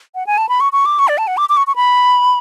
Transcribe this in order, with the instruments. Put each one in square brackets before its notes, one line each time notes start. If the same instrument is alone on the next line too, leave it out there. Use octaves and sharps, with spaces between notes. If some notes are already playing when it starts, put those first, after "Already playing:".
[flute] F#5
G#5
A5
B5
C#6
C#6
D6
C#6
D5
A5
F#5
D6
D6
C#6
C#6
B5